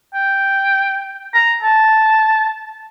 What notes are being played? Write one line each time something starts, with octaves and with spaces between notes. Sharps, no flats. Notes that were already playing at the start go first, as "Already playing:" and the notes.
G5
A#5
A5